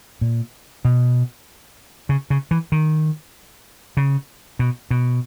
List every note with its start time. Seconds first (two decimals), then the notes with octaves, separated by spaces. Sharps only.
0.21 A#2
0.85 B2
2.09 C#3
2.30 C#3
2.51 E3
2.72 D#3
3.97 C#3
4.59 B2
4.91 B2